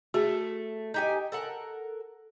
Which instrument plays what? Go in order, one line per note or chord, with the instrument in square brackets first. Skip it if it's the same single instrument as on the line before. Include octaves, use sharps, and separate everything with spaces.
[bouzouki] A3 [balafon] F#4 G#4
[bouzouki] D#4 G4 G#5
A4 A#4 F#5